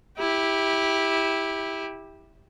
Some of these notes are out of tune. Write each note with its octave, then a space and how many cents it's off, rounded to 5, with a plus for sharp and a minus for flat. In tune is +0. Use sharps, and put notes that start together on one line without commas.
E4 -15 G4 +10